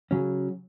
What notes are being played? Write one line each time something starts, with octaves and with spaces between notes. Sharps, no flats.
C#3 F#3 C#4